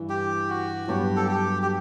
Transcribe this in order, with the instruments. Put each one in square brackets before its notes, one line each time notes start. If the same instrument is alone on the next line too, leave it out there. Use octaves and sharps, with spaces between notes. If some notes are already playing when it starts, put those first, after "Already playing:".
Already playing: [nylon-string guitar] G2 E3
[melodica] G4
F#4
[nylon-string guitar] G2 F#3 B3 [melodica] G4
[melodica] A4
G4
G4